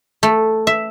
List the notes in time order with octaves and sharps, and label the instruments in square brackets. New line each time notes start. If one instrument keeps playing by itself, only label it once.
[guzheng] A3
E5